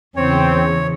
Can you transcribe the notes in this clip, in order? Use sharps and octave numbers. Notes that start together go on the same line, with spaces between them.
E2 C#3 C4 C#5